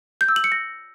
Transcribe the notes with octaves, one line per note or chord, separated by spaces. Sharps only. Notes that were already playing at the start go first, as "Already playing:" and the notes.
G6
E6
F#7
C#7
A#6